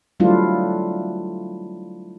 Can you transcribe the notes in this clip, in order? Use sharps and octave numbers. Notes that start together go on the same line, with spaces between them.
F#3 G3 A3 D4 E4 F4